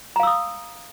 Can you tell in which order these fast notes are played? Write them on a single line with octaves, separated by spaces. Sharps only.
A#5 F5 E6 D#6